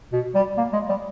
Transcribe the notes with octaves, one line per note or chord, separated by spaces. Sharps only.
B2
G3
A#3
G#3
G3